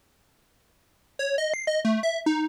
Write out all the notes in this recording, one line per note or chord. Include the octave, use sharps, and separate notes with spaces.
C#5
D#5
C7
D#5
A3
E5
D#4